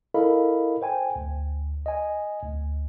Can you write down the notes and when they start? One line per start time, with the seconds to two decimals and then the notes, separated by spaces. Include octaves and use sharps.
0.14 E4 A4 A#4 D#5 F5 B5
0.82 C5 G5 G#5
1.16 D2
1.86 D#5 G#5
2.42 D2